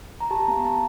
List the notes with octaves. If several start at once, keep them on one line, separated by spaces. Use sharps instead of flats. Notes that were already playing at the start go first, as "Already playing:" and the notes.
A#5
G4 A5
B3 A#5
B3 A5